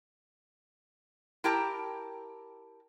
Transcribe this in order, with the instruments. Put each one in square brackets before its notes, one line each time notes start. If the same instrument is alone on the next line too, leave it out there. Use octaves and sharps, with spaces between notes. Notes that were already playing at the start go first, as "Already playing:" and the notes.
[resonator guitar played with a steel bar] E4 G4 A#4 G5 A5 A#5